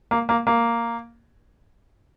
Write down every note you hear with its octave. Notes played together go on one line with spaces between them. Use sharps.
A#3
A#3
A#3